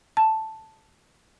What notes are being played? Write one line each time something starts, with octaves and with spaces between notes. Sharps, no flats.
A5